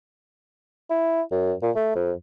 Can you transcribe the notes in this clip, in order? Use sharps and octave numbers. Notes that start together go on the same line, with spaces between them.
E4
F#2
A#2
A3
F2